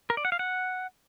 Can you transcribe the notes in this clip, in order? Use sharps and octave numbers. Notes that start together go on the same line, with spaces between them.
A#4
D5
F#5
F5
F#5